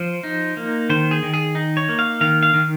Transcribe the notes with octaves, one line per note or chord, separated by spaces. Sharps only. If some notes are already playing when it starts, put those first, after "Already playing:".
Already playing: F3 C5
D#4
A#3
D#3 C5
G#4
D#3
G#4
D#4
C#5
A#3
F5
D#3 F5
F5
D#3